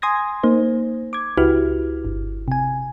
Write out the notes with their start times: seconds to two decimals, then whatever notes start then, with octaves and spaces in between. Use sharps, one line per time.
0.02 G#5 C6 D#6 G#6 A#6
0.43 A#3 D#4 C5
1.13 D6 G#6
1.38 C#2 E4 F#4 G4 B4 F6
2.05 G1
2.48 C3 G#5